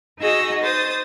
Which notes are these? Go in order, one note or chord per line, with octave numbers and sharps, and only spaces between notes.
D#4 F#4 G#4 D#5 E6
C5 D#6 A6